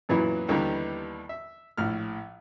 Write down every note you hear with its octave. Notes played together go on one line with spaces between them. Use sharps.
F#2 A#2 E3 F#3 B3 E4
D#2 D3 E3 G3 B3 A#5
E5
A#1 A2 F6